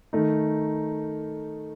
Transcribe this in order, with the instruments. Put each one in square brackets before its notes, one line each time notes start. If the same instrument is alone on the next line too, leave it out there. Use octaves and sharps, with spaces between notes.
[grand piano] D#3 A3 D#4